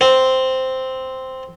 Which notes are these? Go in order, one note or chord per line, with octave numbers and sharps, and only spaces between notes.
C4